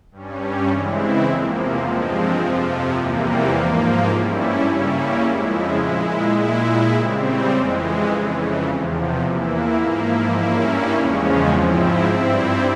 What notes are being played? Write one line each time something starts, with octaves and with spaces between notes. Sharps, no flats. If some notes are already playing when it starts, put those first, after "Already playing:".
G2 G3 C#4
C#3 E3 G#3 C4 E4
E2 C3 F3 A#3
G2 F3 G#3 C4
F2 C3 F3
E2 C3 E3 G3 A#3
G#2 F3 A#3
G2 G3 C#4 E4
C#3 G3 A#3 C#4 E4
F2 C#3 F3 G#3 E4
A#2 G#3 E4
A#2 G#3 E4
C#3 G3 C4
F2 E3 G#3
F2 C#3 E3
E2 C3 F3
E2 E3 A#3 E4
G#2 F3 A#3 E4
G2 G3 A#3 C#4 E4
E2 C#3 F3 G#3 C#4
G#2 F3 C4 E4
G2 G3 C4 E4